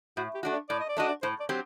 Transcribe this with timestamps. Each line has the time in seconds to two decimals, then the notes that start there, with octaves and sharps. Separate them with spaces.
0.17 A2 F#4
0.35 G4
0.43 A3 D4 F#4
0.53 D5
0.69 A2 D5
0.80 D#5
0.89 D5
0.97 A3 D4 F#4 D#5
1.08 D5
1.22 A2 C5
1.40 D5
1.49 F#3 C4 G4